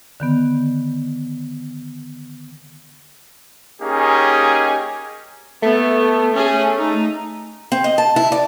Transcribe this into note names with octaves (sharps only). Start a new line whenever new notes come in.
D3 D#3 B3
A#3 C#4 D#4 G4 G#4
A3 B3
C#4 G#4
D#4
C4
D#5
A5
E4
D5